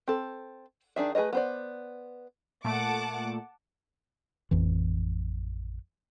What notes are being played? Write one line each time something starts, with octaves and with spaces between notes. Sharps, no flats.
C4 A4
D#3 D4 G#4 E5
A3 G#4 B4 C#5 D#5
B3 C5 D5
A#2 A3 F#5 A5 D6
A1 F2 E3